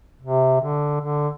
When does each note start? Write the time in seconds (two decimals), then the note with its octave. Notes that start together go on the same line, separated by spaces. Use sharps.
0.22 C3
0.61 D3
1.00 D3